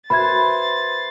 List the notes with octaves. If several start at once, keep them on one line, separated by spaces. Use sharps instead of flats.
B4 C5 E5 B5 C6 G#6 A6